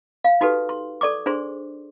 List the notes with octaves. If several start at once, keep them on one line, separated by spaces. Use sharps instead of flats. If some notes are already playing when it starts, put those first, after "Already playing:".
F5
D#4 F#4 G4 A4 B4
C6
A4 D5 C#6 D6
D4 G#4 C5 C6